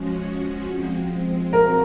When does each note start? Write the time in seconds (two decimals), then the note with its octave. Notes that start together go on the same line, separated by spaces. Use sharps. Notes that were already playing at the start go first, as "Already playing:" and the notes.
Already playing: F3 G#3 C#4 F#4
0.70 F3 G#3 C4
1.53 F3 C4 F#4 A#4